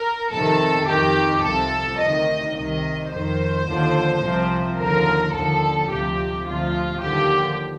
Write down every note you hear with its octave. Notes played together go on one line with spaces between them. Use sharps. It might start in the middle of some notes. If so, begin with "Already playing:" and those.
Already playing: A#4
F2 C3 D#3 A4
F2 D#3 G4
C2 C3 F3 A4
D2 C3 D#3 D#5
C2 C3 D#3 D#5
F2 D#3 C5
D#2 D3 F3
C2 C3 F3
D#2 D3 F3 A#4
D#2 D3 F3 A4
D2 C3 F3 G4
D2 C3 F3 F4
D#2 D3 F3 G4